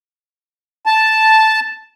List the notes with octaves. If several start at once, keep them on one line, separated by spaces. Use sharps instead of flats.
A5